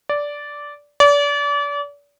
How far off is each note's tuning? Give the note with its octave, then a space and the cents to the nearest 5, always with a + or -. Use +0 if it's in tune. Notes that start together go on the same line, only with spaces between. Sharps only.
D5 -10
D5 -35